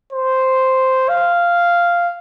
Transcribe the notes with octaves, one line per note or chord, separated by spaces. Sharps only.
C5
F5